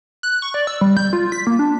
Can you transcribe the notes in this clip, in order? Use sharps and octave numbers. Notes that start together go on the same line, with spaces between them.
F#6
C#6
D5
E6
G3
G6
F4
B6
A#3
D4